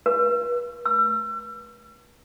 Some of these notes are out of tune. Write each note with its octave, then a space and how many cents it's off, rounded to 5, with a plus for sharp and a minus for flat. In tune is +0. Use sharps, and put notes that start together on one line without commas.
B4 -40
E6 +40